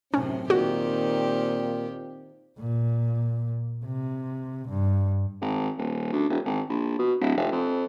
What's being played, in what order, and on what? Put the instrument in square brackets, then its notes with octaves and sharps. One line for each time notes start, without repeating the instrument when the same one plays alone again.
[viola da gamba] F#2 A2 C3 [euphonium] C4 [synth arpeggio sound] C#4
[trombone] A#2 [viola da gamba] D#3 G4 [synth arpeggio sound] F#4
[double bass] A#2
C3
G2
[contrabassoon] G#1
D#1
D2
E1
G#1
A#1
B2
D1
F1
F2